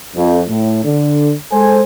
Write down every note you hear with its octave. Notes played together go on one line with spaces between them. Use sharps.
F2
A2
D3
G#3 A4 C5 G#5